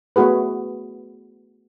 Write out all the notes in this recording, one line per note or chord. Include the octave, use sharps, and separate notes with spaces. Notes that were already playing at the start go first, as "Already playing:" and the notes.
A3 B3 F#4 G#4 B4